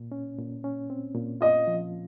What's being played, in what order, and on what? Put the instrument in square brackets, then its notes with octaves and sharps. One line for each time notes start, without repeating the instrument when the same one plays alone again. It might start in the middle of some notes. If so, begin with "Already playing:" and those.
Already playing: [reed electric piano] A#2
C#4
A#2
C#4
C4
A#2
[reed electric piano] F4 [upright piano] D#5
[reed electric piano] F3